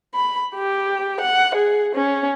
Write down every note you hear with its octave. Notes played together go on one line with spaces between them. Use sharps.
B5
G4
F#5
G#4
C#4